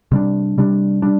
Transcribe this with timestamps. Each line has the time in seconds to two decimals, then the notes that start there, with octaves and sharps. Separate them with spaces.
0.12 C3 G3 D4
0.58 C3 G3 D4
1.02 G3 D4